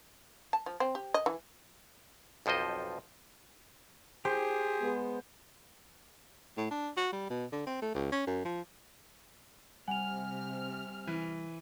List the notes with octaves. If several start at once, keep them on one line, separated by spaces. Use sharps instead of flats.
A5
F3
C4
G4
D#5
E3
B1 F2 F3 C5 D#5
G4 G#4 C5
G#3 B3
A2
D4
F#4
G3
B2
D3
C4
A3
C#2
C#4
F#2
F3
C3 G3 F#5 G#5 F6 F7
E3